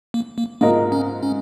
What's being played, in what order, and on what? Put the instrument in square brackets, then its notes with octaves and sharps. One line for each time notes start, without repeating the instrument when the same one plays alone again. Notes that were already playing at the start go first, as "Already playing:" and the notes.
[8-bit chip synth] A#3
A#3
[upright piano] G#2 G#3 F4 A#4 D#5 [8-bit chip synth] A#3
[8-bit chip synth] C#4
C#4